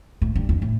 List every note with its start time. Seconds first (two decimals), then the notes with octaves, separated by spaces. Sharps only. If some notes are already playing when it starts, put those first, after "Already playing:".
0.22 A2
0.35 G2
0.49 F2
0.62 A2